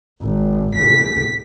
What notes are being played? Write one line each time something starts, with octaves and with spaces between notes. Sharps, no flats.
G#1
B6